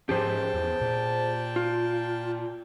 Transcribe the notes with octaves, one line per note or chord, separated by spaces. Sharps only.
G#2 F3 C#4 G4 G#4 C5 G5 A5
E2
A#2
F4